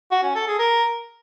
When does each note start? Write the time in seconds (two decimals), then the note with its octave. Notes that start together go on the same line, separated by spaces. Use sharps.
0.11 F#4
0.23 C#4
0.35 A4
0.47 G#4
0.59 A#4